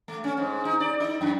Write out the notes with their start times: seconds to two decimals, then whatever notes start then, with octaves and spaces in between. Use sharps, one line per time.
0.08 A3
0.24 C#4
0.37 G#2
0.65 D#4
0.80 D5
1.00 D#4
1.21 F#2